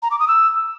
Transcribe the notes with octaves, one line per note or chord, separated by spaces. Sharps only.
A#5
D6
D#6
E6